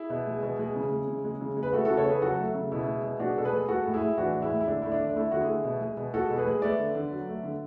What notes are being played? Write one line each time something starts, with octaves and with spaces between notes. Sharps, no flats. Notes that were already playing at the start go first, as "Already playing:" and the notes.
Already playing: E4 G#4
B2
G#3
B2
G#3
C#3
G#3
C#3
G#3
C#3
G#3
B4
A3 F#4 A4
C#3 F#4 A4
A4 C#5
C#3 G#4 B4
F#3 F#4 A4
A3
C#3
B2 E4
G#3
B2
G#3 D4 F#4
B2 A4
G#4 B4
G#3
G#3 F#4 A4
A2
E4 G#4
A2
E3 D4 F#4
G#3
E4
A2
E4
D3 D4
A3 E4
D4
D3
D4
A3 E4
D3 F#4
E4 G#4
A3
B2
G#3
B2
G#3 F#4 A4
B2
G#4 B4
G#3
A3 B4 D5
D3
D3
F#3
A3
D3